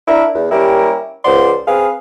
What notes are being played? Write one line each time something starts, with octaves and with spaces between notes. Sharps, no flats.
D4 E4 A#4
E2
G3 A#3 C#4 E4 G4 A#4
C#2 F3 C5 D5 F#5 C6
C4 G#4 B4 F5